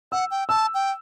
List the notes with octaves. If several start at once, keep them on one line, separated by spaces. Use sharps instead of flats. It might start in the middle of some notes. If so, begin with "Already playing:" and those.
F#5 E6
G5
A5 E6
G5